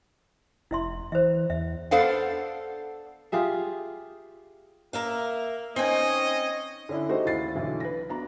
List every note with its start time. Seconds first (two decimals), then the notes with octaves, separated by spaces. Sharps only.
0.71 F1 E4 E5 C6
1.12 E3 C5 E5
1.50 E2 E5
1.91 B3 D4 A4 C5 F5 F#5
3.32 F4 G4 G#4 E5
4.93 A#3 A#4 E5 F5
5.76 C4 C#4 D#4 D#5 G5 G#5
6.89 D3 C#4 D4 E4
7.09 A3 D#4 F#4 G4 C5 D#5
7.26 D#2 E4 A6 C7
7.55 B1 D3 E3
7.80 B4 A#6
8.09 B3 D4 F#4 D5 A#5